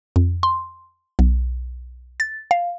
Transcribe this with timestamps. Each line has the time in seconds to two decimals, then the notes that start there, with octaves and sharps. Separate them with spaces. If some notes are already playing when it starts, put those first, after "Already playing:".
0.16 F2
0.43 C6
1.19 B1
2.20 A6
2.51 F5